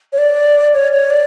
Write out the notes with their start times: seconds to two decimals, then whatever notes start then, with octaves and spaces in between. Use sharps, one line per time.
0.13 C#5
0.18 D5
0.74 C#5
0.92 C#5
1.10 D5